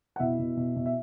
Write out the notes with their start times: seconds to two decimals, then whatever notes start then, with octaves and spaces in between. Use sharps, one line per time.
0.16 F#5
0.20 B2 E4 E5
0.39 B2
0.57 B2
0.76 B2
0.86 E5